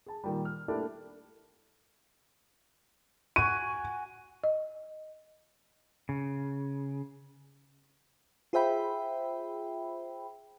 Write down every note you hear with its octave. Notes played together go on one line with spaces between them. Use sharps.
G#4 A5
A#2 D#3 G3
F6
A3 A#3 D4 E4 G4 D5
F#4 G#5 D#7
D#5
C#3
F4 G#4 C5 E5 G5 B5